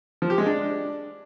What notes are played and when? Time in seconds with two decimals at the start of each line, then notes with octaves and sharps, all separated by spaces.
0.22 F3
0.30 G4
0.38 G#3
0.46 D4